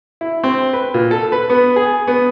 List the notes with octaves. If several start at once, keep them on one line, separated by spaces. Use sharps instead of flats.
E4
C4
B4
A#2
A4
B4
B3
G#4
B3